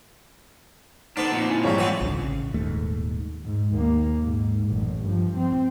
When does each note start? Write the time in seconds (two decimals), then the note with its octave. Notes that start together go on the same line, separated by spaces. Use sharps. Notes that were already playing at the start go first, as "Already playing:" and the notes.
1.17 D3 B3 D4 D#4 C5
1.31 F2 A#2
1.49 E4 G#5
1.64 G#1 G#2 F3 G3 C#5
1.78 E3 B3 C4 F4 F#5 G#5
2.01 G#1 C#2 D3
2.19 A1 C#3
2.54 D#1 D#2 G#2 A3
3.44 G#2
3.74 D#2 A#3
4.21 G#2
4.68 A1 F#2
5.03 G2 F3
5.36 C4